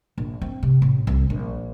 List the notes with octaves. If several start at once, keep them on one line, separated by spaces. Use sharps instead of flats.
A#1
C4
C3
A1
C2
A#1